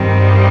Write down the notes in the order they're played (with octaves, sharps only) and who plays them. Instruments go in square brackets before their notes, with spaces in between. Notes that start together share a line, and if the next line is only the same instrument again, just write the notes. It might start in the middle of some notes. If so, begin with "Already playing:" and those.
Already playing: [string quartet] G2 D#3 G3 C4